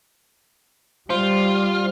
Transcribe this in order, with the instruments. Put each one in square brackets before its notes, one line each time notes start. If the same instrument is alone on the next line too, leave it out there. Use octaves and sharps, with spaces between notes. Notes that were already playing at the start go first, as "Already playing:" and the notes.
[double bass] G3 [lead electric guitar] F4 [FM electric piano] C5